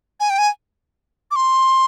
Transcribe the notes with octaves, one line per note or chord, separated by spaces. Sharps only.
G#5
G5
G#5
D6
C6